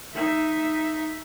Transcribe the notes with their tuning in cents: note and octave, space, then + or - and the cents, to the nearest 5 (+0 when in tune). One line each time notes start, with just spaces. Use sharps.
D#4 +0 E5 +0